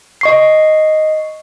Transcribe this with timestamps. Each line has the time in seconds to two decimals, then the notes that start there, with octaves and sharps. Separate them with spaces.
0.21 D#5 C#6 C7